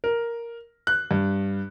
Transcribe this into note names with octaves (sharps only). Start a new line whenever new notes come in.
A#4
F#6
G2